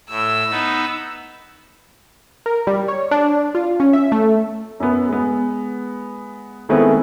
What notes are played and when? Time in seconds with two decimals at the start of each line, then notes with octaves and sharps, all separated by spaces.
0.10 A2 E6
0.50 B3 D#4
2.46 A#4
2.67 G3
2.88 C#5
3.11 D4
3.55 F4
3.80 C#4
3.93 E5
4.12 A3
4.80 F#2 B3
5.09 G#3 B3
6.69 D#3 G#3 A3 B3 C4 E4